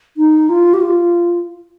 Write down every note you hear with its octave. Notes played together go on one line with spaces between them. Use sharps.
D#4
F4
G4
F4